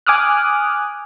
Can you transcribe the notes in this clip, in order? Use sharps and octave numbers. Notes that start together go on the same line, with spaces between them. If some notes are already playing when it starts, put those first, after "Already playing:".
G#5 D6 D#6 F6 F#6